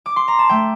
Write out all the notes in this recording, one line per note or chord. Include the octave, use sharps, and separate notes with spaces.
D6
C6
A#5
A5
A3 G5